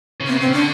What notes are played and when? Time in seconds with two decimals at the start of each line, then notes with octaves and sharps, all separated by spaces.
0.20 C#3
0.27 C3 B3
0.36 C#3
0.40 C4
0.47 C#3
0.53 D3 D4